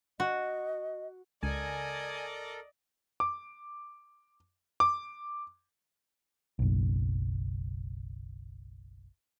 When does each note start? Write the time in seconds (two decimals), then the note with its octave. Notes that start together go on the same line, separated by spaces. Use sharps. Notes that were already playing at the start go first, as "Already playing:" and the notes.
0.20 F#4 D#5
1.43 C#2 A4 A#4 D5 D#5 G#5
3.20 D6
4.80 D6
6.59 F#1 B1